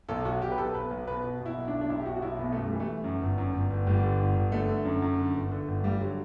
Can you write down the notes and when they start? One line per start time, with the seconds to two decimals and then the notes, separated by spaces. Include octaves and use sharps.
0.09 B1 A4
0.25 B1 F#4
0.42 B1 G4
0.52 B4
0.58 B1 A4
0.74 B2 B4
0.91 B1
1.08 B2 B4
1.24 B2
1.41 B2
1.46 E4
1.57 B1
1.68 D4
1.73 B1
1.81 D4
1.89 B1 E4
2.00 G4
2.06 B2 F#4
2.16 F#4
2.22 B1 E4
2.39 B2 B3
2.52 F#2 A3
2.66 G3
2.72 E3
2.80 A3
2.88 E3
3.04 F#2
3.21 G1
3.38 F#2
3.54 G1
3.70 G1
3.87 G1 G3
4.03 D3
4.19 G1
4.36 G1
4.52 D3 A3
4.69 D3
4.85 F#2
5.02 F#2
5.18 D3
5.35 G1
5.52 D3
5.68 G1
5.84 G2 G3
6.00 D3 F#3